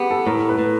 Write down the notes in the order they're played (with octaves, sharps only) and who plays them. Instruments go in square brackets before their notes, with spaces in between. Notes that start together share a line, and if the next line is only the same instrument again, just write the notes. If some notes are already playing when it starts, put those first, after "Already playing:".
Already playing: [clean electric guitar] B3 [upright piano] G4 G#4
[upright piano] A4
[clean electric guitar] A2 [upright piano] A#4
[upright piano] B4
[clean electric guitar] A2